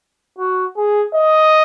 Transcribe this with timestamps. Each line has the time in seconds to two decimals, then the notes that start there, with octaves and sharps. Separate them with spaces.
0.38 F#4
0.77 G#4
1.15 D#5